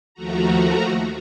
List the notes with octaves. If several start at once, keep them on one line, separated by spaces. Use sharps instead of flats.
D#2 F3 A3 F#4 A#5